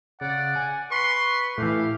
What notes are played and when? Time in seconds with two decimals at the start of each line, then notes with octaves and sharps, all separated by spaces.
0.21 C#3 D5 F#5
0.56 G#5
0.92 B4 C6 C#6
1.58 A2 E3 A3 G4 F5